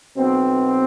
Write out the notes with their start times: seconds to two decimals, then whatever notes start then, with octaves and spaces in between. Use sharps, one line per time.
0.17 B1 B2 C4